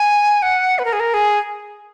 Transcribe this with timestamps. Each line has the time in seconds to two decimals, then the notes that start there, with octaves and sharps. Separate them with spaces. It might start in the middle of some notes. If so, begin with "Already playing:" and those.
Already playing: G#5
0.42 F#5
0.79 B4
0.85 A#4
0.93 G#4
1.00 A#4
1.14 G#4